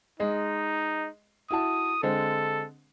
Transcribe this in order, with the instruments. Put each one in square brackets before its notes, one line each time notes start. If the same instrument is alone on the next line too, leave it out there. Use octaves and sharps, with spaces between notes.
[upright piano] G#3 D#5 [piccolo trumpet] D#4
[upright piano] E4 F#4 A5 [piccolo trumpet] D#6
[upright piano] D3 G#3 C4 [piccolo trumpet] A4